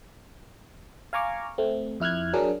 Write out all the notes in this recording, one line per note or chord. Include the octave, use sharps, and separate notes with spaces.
F5 G#5 A#5 C#6 D6 F6
A3 C4
F2 E4 F6 F#6 G#6
F#3 D4 G#4 A#4